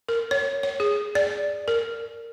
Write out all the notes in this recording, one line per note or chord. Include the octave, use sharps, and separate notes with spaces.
A#4
C#5
C#5
G#4
D5
A#4